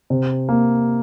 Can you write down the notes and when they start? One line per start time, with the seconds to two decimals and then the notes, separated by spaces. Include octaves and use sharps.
0.10 C3
0.49 A#3